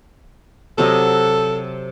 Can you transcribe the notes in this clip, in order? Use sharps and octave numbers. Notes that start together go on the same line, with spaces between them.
C3 F#3 A4 D#5